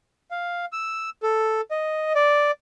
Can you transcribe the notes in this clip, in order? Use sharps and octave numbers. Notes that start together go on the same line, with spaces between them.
F5
E6
A4
D#5
D5